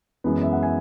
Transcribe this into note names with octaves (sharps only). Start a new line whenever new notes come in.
F#2 E3 G#3 B3
E5
F#5
G#5